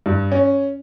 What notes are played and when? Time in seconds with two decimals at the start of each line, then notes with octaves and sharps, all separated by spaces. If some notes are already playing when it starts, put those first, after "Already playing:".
0.06 G2
0.32 C#4